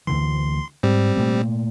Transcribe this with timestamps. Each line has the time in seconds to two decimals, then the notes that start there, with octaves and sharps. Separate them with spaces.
0.07 D2 D3 E3 C6
0.83 G#2 G3 C4
1.16 A#2 A3 A#3